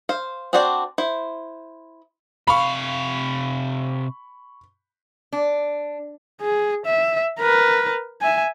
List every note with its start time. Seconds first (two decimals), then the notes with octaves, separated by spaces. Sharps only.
0.09 C5 F5
0.53 C4 D4 F#4 C5 D5
0.98 E4 C5
2.47 C3 F5 B5 C#6
5.32 D4
6.41 G#4
6.86 E5
7.39 A#4 B4
8.21 E5 G#5